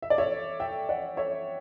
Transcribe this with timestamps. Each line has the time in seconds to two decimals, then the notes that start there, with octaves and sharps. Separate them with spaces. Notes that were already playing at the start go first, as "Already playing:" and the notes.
0.02 E5
0.10 D5
0.18 C#5 E5
0.60 E5 G5
0.89 D5 F#5
1.17 C#5 E5